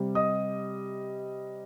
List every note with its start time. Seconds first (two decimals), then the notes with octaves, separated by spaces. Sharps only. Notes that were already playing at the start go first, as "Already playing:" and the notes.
Already playing: C3 G3
0.15 D#5 D#6